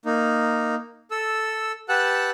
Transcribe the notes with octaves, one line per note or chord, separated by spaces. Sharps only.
A#3 D#4
A4 E6
G4 B4 F#5 A5 E6 F#6